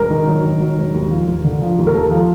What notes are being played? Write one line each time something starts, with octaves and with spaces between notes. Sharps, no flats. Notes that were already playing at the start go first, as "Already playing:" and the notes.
Already playing: E1 A#4
D#3
F#3
D#3
F#3
E1
D#2
F3
D#2
D3
F3
D#2
A#4
D#2 A4
F3